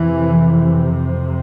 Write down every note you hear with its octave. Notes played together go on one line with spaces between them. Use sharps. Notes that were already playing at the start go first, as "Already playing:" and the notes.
Already playing: F2 C3 E3